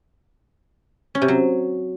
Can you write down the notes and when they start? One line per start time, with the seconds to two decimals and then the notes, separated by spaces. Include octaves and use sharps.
1.15 C#4
1.22 C3
1.28 F#3